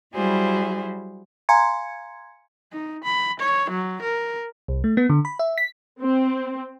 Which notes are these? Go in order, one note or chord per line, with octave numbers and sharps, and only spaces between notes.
F#3 G3 E4 F#4 G#4 C5
F5 G#5 A#5 C6 G#6 C#7
D#4
B5
C#5
F#3
A#4
C2
A3
B3
D3
B5
E5
B6
C4